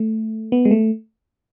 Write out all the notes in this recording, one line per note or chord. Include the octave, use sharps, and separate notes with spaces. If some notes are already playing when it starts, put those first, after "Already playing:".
Already playing: A3
B3
G#3
A3